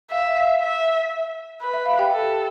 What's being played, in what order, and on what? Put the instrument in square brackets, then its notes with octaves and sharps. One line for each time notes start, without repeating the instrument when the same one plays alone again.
[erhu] E5 [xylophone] F5
[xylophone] F5
[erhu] E5
B4
[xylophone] E5
F5
G4 G5
[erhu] A4